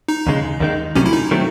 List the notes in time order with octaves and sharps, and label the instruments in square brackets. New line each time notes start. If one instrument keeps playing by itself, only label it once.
[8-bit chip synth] D#4
[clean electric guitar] D#2 C#3 G#3
D#2 D#3 G#3 D#4
[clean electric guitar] C2 C3 F#3 A3 [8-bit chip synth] C#4
[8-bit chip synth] E4
D#4
[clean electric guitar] D#3 F#3 A3 C4